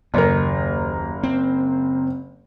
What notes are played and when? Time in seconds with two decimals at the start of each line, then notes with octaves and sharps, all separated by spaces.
0.14 F#1 D#2 A#4
1.23 C4